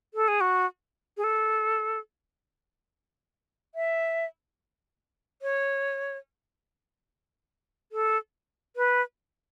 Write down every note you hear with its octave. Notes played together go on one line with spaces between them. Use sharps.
A4
G#4
F#4
G#4
A4
E5
C#5
A4
B4